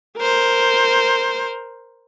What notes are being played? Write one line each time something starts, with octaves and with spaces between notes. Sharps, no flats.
A#4 C5